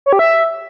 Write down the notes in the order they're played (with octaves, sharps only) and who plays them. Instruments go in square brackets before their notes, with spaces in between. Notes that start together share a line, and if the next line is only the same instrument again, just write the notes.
[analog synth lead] C#5
G4
E5